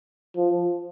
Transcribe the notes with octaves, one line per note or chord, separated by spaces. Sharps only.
F3